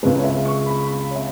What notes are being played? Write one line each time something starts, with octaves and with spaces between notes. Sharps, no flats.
C#2 C#3 G#3 B4
C#5
E5
C#6
B5
B5
C#5
E5